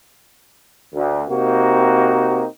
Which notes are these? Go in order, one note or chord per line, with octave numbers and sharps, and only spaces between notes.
D2
C3 A#3 C4 D#4 F#4